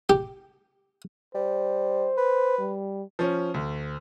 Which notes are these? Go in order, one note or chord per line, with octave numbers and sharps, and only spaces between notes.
G4
G3 C5
B4
G3
F3 C#4
D2